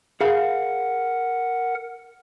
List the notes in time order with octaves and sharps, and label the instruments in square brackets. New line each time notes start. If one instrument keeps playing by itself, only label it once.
[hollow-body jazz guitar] G#4 F5 [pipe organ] A#4 F#5